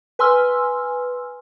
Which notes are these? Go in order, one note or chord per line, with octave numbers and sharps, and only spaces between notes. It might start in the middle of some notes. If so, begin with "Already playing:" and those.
B4 G#5 C6 E6 F6